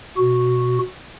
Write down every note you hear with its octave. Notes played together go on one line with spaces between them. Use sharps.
B2 F#4